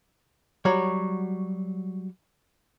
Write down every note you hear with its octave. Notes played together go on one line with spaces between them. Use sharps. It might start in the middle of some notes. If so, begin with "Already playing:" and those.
F#3 G3 F#4 C#5